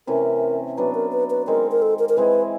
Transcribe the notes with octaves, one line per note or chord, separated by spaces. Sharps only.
C3 E3 A3 C#4 A#4
F#3 B3 D4 B4
A#4
B4
B4
D#3 G#3 C4 A#4
A#4
A4
A#4
A#4
E3 G#3 C4 E4 B4